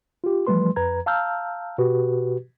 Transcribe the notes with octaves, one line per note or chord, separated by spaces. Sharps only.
F4 G4
E3 F3 G3 A3 B4 C6
F2 B4 A#5 G#6
F5 A5 A#5 E6 F6 G6
B2 F#4 G4 B4